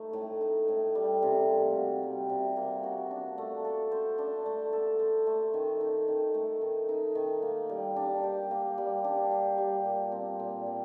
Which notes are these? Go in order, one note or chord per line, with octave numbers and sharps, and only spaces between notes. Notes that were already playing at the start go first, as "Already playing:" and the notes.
Already playing: A3 D#4
A2
D#4
A2
G3
C3
A#3
F#4
G3
C3
A#3
F#4
D4
A3
A4
C5
D4
A3
A4
C5
A3
D#3
D#4
D#3
A3
D#3
D#4
D#3
A#3
G3
D4
G4
A#3
G3
D4
G4
G3
A#2
C4
A#2
G3